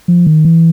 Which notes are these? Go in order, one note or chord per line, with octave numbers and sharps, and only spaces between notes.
F3
D#3
E3